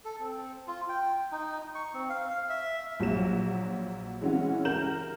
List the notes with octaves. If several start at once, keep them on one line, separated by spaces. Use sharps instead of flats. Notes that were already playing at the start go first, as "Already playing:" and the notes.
A4
C4
F4
G5
D#4
C#6
C4
F5
E5
A#1 F#3 E7
E3 G#3 C4 C#4 E4 F#4
A#4 G6 E7 F#7